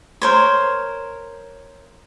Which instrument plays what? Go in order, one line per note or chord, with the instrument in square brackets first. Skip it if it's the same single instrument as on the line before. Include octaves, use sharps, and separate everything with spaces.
[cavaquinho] A#4 C5 C#5